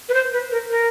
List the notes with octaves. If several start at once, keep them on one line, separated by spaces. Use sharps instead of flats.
B4
C5
B4
A#4
A#4